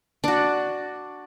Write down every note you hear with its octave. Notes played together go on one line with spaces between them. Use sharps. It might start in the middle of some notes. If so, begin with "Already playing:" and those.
D4 F#4